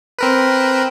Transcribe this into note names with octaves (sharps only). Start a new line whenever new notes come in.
C4 A#4 B4